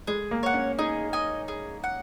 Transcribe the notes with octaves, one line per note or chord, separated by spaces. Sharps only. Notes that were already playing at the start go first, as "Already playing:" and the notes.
G#3 G#4
A#3
C#5 F#5
C#4
D#4 G#4
D#5 G#5
G#4
F#5